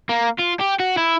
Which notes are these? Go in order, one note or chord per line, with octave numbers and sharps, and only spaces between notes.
A#3
F4
G4
F#4
E4